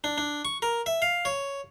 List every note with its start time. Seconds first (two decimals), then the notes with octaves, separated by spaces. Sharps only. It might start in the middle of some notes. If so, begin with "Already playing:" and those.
0.04 D4
0.18 D4
0.45 C#6
0.62 A#4
0.86 E5
1.02 F5
1.25 C#5